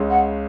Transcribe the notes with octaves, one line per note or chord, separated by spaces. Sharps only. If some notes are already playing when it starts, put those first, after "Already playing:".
Already playing: C#2 C#3 G#3 C#4
F#5